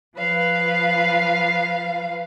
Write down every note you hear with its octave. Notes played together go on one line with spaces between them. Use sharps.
F3 B4 F5